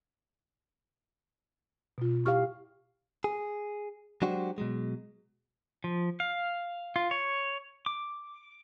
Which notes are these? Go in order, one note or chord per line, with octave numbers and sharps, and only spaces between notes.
B2 F4
E4 G4 F5 C#6 F6
G#4
F#3 G#3 D4 F#4 G4 C5
B2 F#3 G#3
F3
F5
F4
C#5
D6